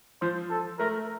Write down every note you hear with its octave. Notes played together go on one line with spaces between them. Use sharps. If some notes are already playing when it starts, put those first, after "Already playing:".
F3 C5
A4
A3 A#4